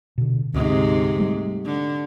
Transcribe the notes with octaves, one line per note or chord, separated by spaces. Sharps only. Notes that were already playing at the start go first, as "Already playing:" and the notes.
B2 D3
D2 G#2 C3
G3 A3
D3